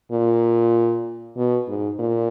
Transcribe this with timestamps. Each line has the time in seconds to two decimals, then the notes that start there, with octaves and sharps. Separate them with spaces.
0.12 A#2
1.37 B2
1.68 G#2
1.99 A#2